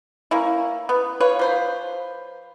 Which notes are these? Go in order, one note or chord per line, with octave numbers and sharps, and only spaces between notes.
A#3 C#4 E4
B3
F4 B4 C#5
F3 C5 B5